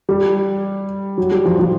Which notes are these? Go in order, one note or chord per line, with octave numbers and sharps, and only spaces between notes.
G3
F#3
G3
F3
F3